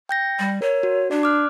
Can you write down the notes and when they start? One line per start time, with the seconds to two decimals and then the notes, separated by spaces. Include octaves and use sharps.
0.09 G5 G6 A#6
0.39 G3
0.62 A#4 C#5
0.83 F#4
1.11 D4 D5
1.23 D6 F6 F#6